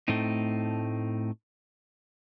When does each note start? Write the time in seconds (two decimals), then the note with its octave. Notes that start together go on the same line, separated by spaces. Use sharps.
0.08 A2 A3 C4 D#4